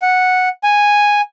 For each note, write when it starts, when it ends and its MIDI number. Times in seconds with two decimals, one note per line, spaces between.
0.02 0.49 78
0.64 1.21 80